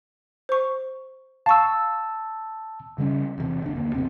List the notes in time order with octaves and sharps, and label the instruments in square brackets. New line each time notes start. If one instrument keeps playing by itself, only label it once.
[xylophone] C5 C#6
[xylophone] F5 C#6 [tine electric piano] A5 E6
[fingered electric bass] C#3 G3 A#3 C#4
E2 C3
F#1 F#2 D4
D2 A#3
A1 E2 C3 C4